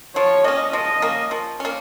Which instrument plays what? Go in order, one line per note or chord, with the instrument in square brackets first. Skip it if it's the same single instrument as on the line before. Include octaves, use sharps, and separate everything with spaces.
[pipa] F3 [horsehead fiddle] C#5
[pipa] A#3 C#4 [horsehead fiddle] D#5
[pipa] F3 [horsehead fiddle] D#5
[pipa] A#3 C#4
F3
A#3 C#4